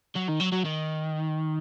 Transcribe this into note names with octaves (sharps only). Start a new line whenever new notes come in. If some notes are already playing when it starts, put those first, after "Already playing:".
F#3
D#3
F#3
F#3
D#3